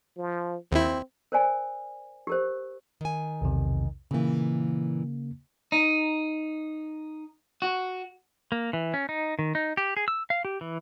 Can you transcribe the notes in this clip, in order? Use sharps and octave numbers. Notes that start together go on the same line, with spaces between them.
F3
D#2 C4 E4
A#4 C5 D5 G#5
G4 A#4 C5
D#3 G#5
B1 E2 C3
A#2 C#3 E3 A#3
D#4
F#4
A#3
E3
C#4
D#4
D#3
D#4
G4
G#4
E6
F5
G4
E3